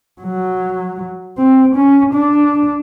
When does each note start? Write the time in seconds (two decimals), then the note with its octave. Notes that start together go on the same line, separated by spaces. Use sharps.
0.22 F#3
1.38 C4
1.76 C#4
2.13 D4